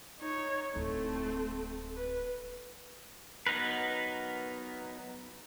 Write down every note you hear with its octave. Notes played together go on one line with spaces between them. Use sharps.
D#4 C#5
D1 A3 C4 E4
B4
F#3 B3 D#4 A#4 B4